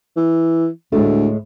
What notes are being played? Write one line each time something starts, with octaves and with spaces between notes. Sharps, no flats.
E3
D2 A2 G#3 A3